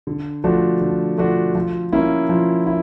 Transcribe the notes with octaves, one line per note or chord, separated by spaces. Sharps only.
D3
F3 A3 D4 F#4
D3
F3 A3 D4 F#4
F3
A#3 C#4 E4
F3
E4